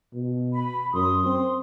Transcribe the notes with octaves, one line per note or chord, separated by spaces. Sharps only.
B2
B5
F#2 C6 D#6
C4